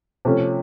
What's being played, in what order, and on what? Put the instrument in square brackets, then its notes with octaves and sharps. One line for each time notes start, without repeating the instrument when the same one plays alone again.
[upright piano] C3 F3 A3 C#4